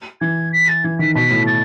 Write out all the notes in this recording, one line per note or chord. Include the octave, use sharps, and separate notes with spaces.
E3 G#6
B6
A6
E3 G#6
D#3 B6
B2 B6
A2
A6